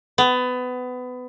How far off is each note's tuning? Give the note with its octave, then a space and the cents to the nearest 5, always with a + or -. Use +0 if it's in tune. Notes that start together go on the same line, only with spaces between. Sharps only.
B3 +25